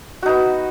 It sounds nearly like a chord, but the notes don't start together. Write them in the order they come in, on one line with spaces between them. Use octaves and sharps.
F#4 D#4 B3